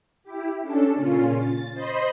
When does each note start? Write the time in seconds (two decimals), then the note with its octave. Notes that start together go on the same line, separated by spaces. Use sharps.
0.24 E4 G4
0.62 C#4 D4 A4
0.95 A#2 C#3 C#4 F4
1.39 A6
1.74 C5 D#5 B5 C6